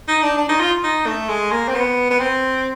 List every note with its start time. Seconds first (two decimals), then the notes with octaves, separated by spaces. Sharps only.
0.08 D#4
0.23 D4
0.38 D4
0.49 D#4
0.60 F4
0.84 D#4
1.06 A3
1.29 G#3
1.52 A#3
1.68 C4
1.75 B3
2.10 B3
2.20 C4